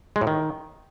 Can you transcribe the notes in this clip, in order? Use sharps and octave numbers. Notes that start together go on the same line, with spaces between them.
G#3
A2
D#3